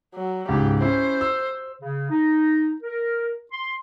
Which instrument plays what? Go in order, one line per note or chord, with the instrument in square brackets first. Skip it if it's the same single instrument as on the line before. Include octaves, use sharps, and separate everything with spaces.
[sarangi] F#3
[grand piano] C#2 G#2 [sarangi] G4
[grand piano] C#4 E4 [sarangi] C5
[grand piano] E6
[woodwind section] C#3
D#4
A#4
C6